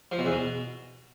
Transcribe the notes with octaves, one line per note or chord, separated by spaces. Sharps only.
F3
B2
E2
B2